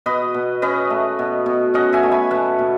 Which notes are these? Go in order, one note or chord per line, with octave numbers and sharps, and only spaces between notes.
B2 B4 D#5
B2
C#4 B4 D#5
A3
B2
B2
C#4 D#5 F#5
E5 G#5
A3
G#5 B5
B2 F#5 A5
B2